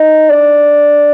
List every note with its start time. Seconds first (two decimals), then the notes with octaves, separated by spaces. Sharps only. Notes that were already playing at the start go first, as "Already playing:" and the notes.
Already playing: D#4
0.30 D4